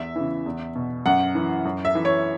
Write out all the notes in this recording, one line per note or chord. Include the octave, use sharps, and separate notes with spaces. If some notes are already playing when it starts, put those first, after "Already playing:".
Already playing: E2 E5
C#3 E3
E2
B2
F#2 F#5
E3
F#2
E5
E3
C#5